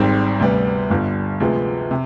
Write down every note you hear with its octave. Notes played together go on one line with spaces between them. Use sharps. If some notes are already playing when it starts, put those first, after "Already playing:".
Already playing: G#1 G#2 G3 C4
D2 C3 G3 B3
G1 G2 D3 G3
D2 C3 F3 G#3 B3
C3